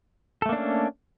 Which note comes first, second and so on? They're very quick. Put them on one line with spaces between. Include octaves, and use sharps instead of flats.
A4 A3 A#3 D4 C#4